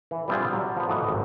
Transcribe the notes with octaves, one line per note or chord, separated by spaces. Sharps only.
E3
G3 B3 C4 D4 F4 G#4
F#3 G3
F3 B3
A2 E3 F#4 D#5 A#5
G#1